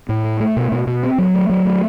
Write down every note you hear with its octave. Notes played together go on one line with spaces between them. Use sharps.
A2
A3
A3
B2
B2
B2
C4
F#3
A3
F#3
A3